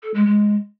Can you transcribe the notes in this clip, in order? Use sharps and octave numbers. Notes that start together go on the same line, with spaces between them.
A4
G#3
G#3